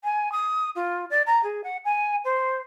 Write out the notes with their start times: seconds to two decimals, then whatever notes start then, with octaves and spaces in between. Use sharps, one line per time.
0.04 G#5
0.32 D#6
0.75 F4
1.10 D5
1.26 A#5
1.43 G#4
1.63 F#5
1.84 G#5
2.24 C5